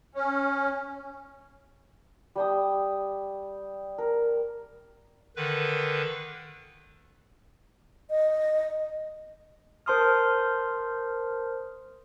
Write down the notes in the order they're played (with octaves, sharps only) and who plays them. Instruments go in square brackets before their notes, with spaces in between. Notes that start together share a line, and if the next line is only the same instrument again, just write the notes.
[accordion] C#4
[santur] G3 G5 D#6
A#4
[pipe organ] D3 D#3 B4
[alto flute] D#5
[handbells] A#4 C5 A5 C6 D#6 F6